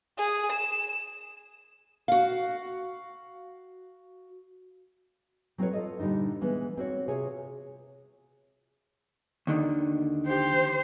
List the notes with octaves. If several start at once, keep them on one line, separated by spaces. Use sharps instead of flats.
G#4
E7
F#4 F5
F#3 C4 F4 A4 B4 C#5
F4 A4 D#5
A#2 D3 G3 D4 D#4
E3 G#3 B3
C4 F#4 C#5
C3 F4 G#4 C#5
D#2 D3 D#3
G4 C5